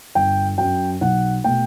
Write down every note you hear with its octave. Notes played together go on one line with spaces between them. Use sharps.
G1 G5
F#2 F#3 G5
B1 F#5
B2 A3 G5